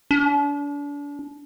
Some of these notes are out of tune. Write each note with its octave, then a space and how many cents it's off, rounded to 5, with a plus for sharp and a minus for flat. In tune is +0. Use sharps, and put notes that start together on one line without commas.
D4 -35